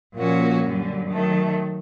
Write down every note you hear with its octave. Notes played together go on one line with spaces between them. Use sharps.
A#2 F3 A#3 C#4 F#4
F#2 D3 G3
D#3 F#3 A3